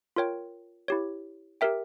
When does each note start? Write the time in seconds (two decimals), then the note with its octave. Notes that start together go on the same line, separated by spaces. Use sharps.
0.16 F4 A#4 C#5 G5
0.88 E4 G4 C#5
1.61 G4 A#4 E5 G5